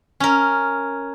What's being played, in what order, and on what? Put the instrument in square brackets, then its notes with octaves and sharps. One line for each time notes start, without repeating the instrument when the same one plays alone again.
[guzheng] C#4 A#4